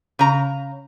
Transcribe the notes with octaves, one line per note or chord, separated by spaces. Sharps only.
C#3 A#5